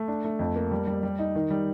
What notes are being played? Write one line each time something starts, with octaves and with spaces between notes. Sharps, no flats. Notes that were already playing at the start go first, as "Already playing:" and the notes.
Already playing: A3
D4
A3
F2
A#3
G3
G3
G3
D#4
D#3
G3